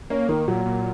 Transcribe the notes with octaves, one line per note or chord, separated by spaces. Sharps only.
A#3 C#4
D#3 A#3
A#2 F#3
A#2